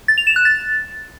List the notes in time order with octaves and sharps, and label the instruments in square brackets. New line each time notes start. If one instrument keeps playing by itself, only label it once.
[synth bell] A6
F7
E7
F#6
A6